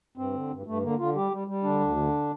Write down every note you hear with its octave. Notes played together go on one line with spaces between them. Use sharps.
G2 C4
D3
G2
G2 A3
D3 A#3
D3 F4
G3 G4
G3
G3
D3 D4
D2
D3